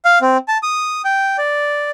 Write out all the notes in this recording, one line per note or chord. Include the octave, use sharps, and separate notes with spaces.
F5
C4
A5
D#6
G5
D5